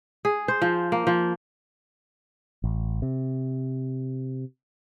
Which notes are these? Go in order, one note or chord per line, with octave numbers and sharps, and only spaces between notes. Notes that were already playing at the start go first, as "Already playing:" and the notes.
G#4
C5
F3
A#3
F3
A1
C3